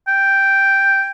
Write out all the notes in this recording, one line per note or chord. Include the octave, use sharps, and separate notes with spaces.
G5